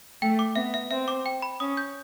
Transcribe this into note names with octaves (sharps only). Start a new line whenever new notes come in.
A3 G5
D6
B3 E5
E5
C4 E5
D6
G5
B5
C#4 D#6
G6